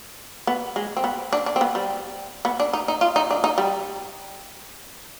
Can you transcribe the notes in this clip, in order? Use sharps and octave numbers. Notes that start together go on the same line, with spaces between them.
B3
G#3
C4
B3
D4
D4
C4
B3
G3
B3
D4
D#4
D#4
F4
D#4
D4
D#4
G3